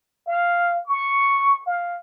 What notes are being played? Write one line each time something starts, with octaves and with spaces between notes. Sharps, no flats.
F5
C#6
F5